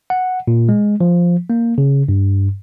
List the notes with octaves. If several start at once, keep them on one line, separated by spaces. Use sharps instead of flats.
F#5
A#2
G#3
F3
A#3
C#3
G2